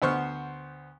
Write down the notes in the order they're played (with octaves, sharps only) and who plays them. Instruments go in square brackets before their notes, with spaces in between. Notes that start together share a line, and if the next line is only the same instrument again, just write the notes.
[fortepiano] D2 B3 C5 C#6 F6